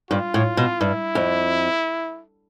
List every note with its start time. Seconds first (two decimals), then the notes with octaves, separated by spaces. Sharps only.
0.11 G2 F4
0.34 A2
0.57 B2
0.80 G2 E4
1.15 F2